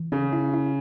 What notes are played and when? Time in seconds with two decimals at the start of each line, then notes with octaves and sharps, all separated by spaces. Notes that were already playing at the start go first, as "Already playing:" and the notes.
Already playing: E3
0.12 C#3 C#4
0.33 E4
0.54 E4